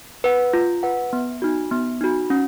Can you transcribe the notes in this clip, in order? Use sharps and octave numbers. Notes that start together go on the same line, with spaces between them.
B4 F#5
F4
B4 F#5
B3
D#4 F#4
B3
D#4 F#4
C#4